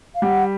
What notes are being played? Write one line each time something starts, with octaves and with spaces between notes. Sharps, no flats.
F5
G3 G4 F#5